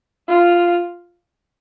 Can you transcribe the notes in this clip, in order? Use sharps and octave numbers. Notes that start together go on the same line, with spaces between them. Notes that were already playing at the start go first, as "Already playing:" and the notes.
F4